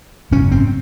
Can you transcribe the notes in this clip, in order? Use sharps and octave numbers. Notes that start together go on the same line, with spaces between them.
G#1 F#2 C#3 C#4
C4